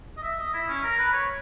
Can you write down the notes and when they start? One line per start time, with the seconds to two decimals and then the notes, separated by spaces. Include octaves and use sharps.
0.17 D#5
0.23 E5
0.38 D#5
0.53 E4
0.68 C#4
0.83 A#4
0.98 B4
1.13 C#5